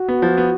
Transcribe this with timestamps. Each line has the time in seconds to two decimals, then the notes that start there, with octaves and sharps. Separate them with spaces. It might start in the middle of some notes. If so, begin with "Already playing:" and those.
Already playing: F#4
0.08 B3
0.22 F3
0.37 B3